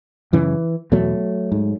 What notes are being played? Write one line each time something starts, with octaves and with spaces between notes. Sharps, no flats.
F#2 C#3 E3
E2 B2 F#3 A3
G#2